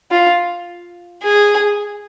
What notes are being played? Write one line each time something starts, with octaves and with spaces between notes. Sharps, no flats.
F4
G#4